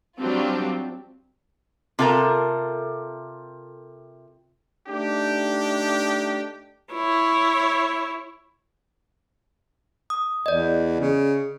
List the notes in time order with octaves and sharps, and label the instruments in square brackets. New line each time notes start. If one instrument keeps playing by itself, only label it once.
[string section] F#3 G3 C4 D4 F4 G4
[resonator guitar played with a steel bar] C3 F4 A4 A#4 A#5
[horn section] A3 D4 D#4 G4
[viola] E4 C#5
[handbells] D#6
[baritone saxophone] E2 [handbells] D5 D#5
[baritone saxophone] C#3